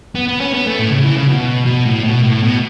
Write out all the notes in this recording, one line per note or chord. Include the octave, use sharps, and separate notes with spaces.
B3
B3
C#4
B3
A3
A2
C#3
E3
C#3
B2
B2
A2
B2
A2
B2